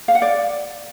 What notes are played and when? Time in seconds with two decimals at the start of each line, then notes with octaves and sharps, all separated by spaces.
0.08 F5
0.15 F#5
0.22 D5